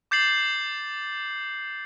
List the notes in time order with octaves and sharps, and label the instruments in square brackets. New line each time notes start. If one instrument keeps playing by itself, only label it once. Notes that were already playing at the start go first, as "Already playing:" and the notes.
[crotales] D6 G6 A6 C7 F#7